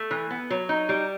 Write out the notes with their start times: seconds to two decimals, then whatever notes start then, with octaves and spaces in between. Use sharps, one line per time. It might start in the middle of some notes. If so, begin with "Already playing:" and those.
Already playing: A3
0.11 E3
0.31 B3
0.50 F#3
0.69 D#4
0.89 G3